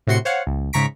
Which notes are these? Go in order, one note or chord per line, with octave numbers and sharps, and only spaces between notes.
A2 C3 F#4 C6 C#7
C5 C#5 F5 F#5
C#2
G#2 C#3 A#5 C#6 B6 D7